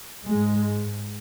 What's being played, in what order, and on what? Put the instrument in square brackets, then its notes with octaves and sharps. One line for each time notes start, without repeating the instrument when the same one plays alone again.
[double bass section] G#2 G#3